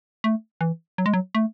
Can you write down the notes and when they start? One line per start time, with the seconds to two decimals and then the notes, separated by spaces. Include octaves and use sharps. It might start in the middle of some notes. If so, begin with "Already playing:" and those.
0.24 A3
0.61 E3
0.98 F#3
1.06 G#3
1.14 F#3
1.35 A3